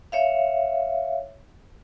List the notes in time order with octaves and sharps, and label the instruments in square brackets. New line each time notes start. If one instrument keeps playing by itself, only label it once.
[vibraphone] C#5 E5 F5